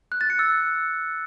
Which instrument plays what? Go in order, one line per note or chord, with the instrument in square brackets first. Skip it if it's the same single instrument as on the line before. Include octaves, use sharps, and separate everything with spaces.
[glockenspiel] F#6
A6
C#7
E6